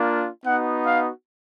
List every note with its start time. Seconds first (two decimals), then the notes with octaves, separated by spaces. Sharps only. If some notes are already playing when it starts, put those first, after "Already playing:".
Already playing: A#3 D4 F4
0.46 B3 D#4 F#4 F#5
0.87 F5